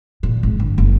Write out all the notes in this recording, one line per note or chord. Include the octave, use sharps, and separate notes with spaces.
A#2
G#1
G1
F#1